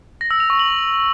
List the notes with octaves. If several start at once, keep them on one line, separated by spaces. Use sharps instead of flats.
A#6
E6
F7
C#6
F#7